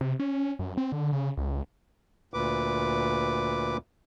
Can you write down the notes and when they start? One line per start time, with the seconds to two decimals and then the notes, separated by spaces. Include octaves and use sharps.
0.01 C3
0.19 C#4
0.59 F#2
0.77 C4
0.92 D3
1.13 C#3
1.37 C#2
2.34 D2 A#2 B4 D6